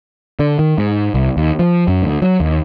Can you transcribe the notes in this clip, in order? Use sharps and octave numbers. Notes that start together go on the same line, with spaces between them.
D3
D#3
G#2
C2
D#2
F3
F#2
D2
F#3
D#2